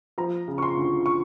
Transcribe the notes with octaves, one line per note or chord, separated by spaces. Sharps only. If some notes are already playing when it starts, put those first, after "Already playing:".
F3 A#5
C#3
C#6
C6
D2
C#6